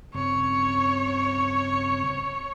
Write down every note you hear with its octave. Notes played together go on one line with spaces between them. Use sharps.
G2 C#3 C4 C#5